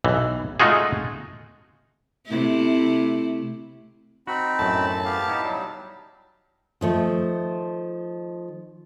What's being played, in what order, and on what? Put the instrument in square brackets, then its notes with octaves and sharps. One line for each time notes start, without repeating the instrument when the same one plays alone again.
[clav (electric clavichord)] B1 E3
G#3 A3 D#4 F4 F#4 G#4
[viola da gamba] C3 A3 E4
[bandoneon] C4 D#4 B5 [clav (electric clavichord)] F#4
[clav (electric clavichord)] F#2 A2 [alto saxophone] A5
[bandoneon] B3 G4 F5
[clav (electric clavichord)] D#4 E4
[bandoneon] F#3 G3
[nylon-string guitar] D#3 F3 A3